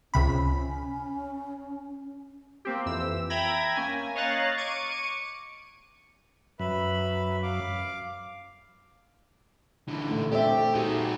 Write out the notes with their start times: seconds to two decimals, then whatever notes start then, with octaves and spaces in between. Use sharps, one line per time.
0.14 C#2 C3 C#4 B5
2.65 A#3 C4 G4
2.86 F2 E3 E6
3.30 E5 G5 A#5 B5 G#6 A#6
3.76 A#3 C#4 G#5
4.15 C#5 D#5 F5 A#5 F#6 A6
4.57 C#6 D6 C#7 D#7
6.60 F#2 B4 E5 B5
7.43 F5 D6
9.88 D3 E3
10.10 A#2 A3
10.32 A3 C4 G4 D5 E5
10.75 A#2 D#4 F#4 G#4